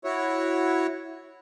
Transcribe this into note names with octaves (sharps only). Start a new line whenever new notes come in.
E4 F#4 C#5